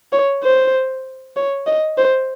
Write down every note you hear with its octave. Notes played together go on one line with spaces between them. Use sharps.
C#5
C5
C#5
D#5
C5